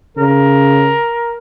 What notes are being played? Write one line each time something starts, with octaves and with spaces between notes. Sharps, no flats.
C#3 A#4